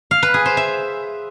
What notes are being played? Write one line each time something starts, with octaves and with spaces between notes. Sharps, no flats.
F5
B4
G#4
C5
E5